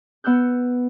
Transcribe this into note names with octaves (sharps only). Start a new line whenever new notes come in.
B3 F#5 E6 F#6 G6